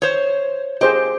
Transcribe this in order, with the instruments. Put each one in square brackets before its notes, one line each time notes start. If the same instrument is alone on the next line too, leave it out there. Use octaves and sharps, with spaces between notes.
[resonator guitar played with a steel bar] C5 C#5
[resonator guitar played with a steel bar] G4 [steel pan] G#4 C5 D#5